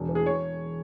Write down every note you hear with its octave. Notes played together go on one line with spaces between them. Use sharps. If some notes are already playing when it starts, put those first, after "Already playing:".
Already playing: E1
E3
G#4
C#5